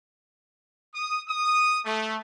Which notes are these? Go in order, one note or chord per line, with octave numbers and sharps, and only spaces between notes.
D#6
D#6
A3